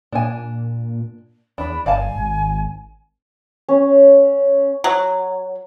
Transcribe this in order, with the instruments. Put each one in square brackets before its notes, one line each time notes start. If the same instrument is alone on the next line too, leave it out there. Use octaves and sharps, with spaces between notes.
[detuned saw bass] A#2 [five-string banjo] D4 G#5
[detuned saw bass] E2 [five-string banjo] D4 [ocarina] B5
[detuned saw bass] G1 [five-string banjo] D5 F5 A5 [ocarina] G#5
[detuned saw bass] G#1
[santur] C#4
[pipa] F#3